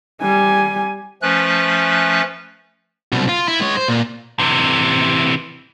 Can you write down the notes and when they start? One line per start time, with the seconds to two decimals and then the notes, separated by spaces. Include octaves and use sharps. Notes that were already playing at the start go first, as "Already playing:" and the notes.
0.22 G3 G#5
1.22 F3 A3 C#4 B4 F#6
3.13 C2 B2
3.29 F4
3.48 E4
3.61 G#3 C#5
3.77 C5
3.88 A#2
4.39 C3 E3